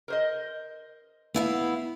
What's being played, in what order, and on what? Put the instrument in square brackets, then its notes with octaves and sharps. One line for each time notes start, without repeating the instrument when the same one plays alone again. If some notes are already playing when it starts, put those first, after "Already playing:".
[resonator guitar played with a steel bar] A#4 C5 D#5
[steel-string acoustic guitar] B3 E4 F5